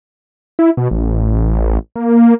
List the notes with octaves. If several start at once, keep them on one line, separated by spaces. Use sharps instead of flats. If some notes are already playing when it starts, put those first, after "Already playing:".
E4
B2
A1
A#3